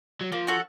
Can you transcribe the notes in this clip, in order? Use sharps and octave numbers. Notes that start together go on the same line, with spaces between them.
F#3
F3 A#3
C#4 F#4 A4